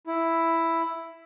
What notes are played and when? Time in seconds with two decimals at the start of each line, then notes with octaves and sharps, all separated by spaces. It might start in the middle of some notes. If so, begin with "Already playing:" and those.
0.07 E4